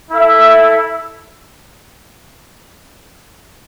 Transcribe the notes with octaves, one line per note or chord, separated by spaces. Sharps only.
E4 A4 E5